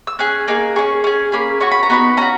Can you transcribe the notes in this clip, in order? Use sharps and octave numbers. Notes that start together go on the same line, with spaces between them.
E6
C#4 G#4 F#6
A#3 D#4 G#4
C#4 G#4 C#6
C#4 G#4
A#3 C#4 G#4 B5
C#4 F#4 C#6
B5
A#5
B3 D#4 F#4 B5
C#4 F#4 A#5